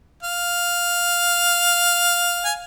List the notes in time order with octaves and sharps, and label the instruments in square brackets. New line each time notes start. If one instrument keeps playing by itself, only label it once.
[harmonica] F5
G#5